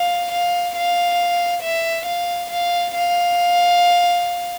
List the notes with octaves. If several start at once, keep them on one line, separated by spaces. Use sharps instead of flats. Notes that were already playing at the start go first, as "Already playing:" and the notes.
Already playing: F5
F5
F5
E5
F5
F5
F5